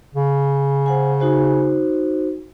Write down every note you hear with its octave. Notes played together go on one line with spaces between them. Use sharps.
C#3
C5 F#5 G#5
D#4 F#4 C5